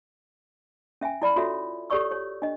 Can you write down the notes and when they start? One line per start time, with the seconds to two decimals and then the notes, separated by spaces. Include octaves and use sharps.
1.01 C#4 E5 G5 G#5
1.22 E4 D5 B5
1.36 F4 F#4 A4 C#5 E5
1.90 G4 A4 C#5 D5 C#6 E6
2.11 C#5
2.42 D4 D#5